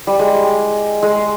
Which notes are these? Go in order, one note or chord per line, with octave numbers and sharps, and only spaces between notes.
G3
G#3
G#3